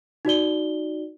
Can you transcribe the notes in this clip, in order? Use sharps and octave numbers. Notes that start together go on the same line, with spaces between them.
D#4 F#4 D5 G7